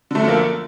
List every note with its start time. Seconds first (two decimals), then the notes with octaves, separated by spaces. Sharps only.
0.11 D3
0.15 A3
0.19 F#2
0.24 F3
0.28 A#3